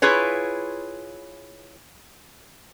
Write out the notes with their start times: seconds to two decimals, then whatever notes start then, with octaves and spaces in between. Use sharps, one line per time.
0.02 E4 F4 G#4 B4 C#5